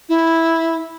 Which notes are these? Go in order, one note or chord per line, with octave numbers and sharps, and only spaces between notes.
E4